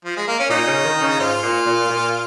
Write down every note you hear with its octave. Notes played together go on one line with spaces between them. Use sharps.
F3
G#3
A#3
C#4
A#2 D#4
C#3
D#3
C#3
G#2 F4
A#2
A#2
A#2